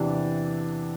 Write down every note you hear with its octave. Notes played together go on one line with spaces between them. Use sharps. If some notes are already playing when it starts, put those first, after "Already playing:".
Already playing: E2 C3 E3 D4